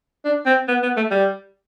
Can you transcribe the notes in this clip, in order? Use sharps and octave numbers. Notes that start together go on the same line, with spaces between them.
D4
C4
B3
B3
A3
G3